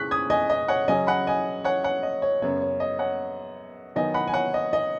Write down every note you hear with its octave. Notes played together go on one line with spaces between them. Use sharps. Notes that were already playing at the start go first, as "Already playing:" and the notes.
Already playing: C#3 G#3 C#6 F#6 B6
D#6 G#6
D#5 G#5
D#5
C#5 F#5
C#3 F#3 C#4 D#5 G#5
F#5 B5
D#5 G#5
C#5 F#5
C#5 F#5
D#5
C#5
F#2 C#3 B3 C#5
C#5
D#5
C#5 F#5
D#3 F#3 B3 D#4 D#5 G#5
F#5 B5
G#5
C#5 F#5
D#5
D#5